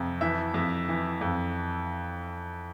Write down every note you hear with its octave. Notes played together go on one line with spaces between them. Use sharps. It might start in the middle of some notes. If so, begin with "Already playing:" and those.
Already playing: F2 C3
E3 E5
F2
E3
F2